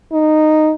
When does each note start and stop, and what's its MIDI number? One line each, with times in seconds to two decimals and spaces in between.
0.12 0.72 63